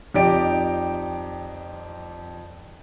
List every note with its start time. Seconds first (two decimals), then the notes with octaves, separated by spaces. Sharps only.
0.14 F2 D#4 G4 D5 D7